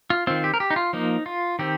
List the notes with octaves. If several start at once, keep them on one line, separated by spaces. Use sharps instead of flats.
F4
D#3 C4 F4
G4
A#4
G4
D#4
F4
F3 A#3 D#4
F4
D#3 C4 G4